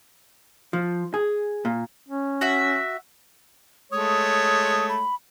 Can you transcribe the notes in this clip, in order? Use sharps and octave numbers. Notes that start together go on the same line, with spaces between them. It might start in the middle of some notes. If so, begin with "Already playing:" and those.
F3
G#4
A#2
C#4
F#4 E5
G#3 A3 C#5 D#6
B5